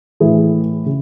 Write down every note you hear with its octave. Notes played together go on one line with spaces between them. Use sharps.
A2 E3 G#4
C#3